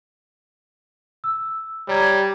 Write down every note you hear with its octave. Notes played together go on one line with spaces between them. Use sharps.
E6
G3 C#5 A#5 G#6